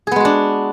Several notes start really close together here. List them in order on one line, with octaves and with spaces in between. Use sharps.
G#4 B3 G#3 F#4 D4